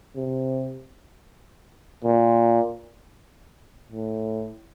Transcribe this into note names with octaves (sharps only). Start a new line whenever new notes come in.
C3
A#2
A2